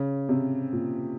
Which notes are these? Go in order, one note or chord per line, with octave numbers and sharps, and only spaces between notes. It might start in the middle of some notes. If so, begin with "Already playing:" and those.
Already playing: C#3
C3
A#2